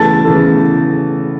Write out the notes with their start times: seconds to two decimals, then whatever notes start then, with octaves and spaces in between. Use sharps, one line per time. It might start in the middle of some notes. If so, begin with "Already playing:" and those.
Already playing: C#3 E3 A3 A5 A6
0.25 C#3 E3 A3